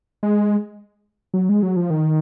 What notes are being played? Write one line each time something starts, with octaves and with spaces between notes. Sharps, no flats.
G#3
F#3
G#3
F#3
F3
D#3